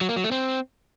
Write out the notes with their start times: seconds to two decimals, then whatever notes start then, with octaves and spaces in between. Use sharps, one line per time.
0.01 F#3
0.09 A#3
0.16 F#3
0.24 A3
0.32 C4